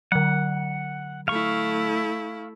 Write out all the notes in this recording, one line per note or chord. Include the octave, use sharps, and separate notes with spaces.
D3 F#3 F#5
A3 E4 F5 C#6